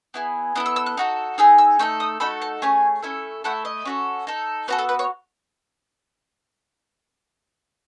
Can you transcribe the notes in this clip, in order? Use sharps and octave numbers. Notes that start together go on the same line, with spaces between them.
B3 E4 G#4
B3 E4 A4 D#6
E6
E6
F#6
D#4 F#4 A4
D#4 G#4 E6
E6
A3 D#4 A4 E6
D#6
A3 D#4 F#4 A4 B5
A5
A3 C#4 G#4 G#5
A3 C#4 E4 A4
A3 E4 A4 F#5
D#5
C#4 F#4 A4
D#4 A4
B3 F#4 A4 C#5
A4
B4
C#5